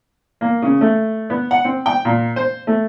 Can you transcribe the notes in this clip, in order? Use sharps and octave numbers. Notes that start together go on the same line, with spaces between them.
A#3
C#3
A3
B3
F#5
C4
G5
A#2
C5
A3